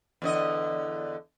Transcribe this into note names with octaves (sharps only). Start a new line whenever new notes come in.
E2 D3 D#5